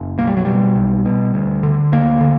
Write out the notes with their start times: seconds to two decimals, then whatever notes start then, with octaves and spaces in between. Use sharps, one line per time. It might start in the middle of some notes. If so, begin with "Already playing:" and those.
Already playing: F#1
0.18 B1 A#3
0.27 G3
0.37 F#3
0.45 B2 G3
0.76 B1
1.05 B2
1.34 D2
1.63 D3
1.92 D2 A#3
2.21 D3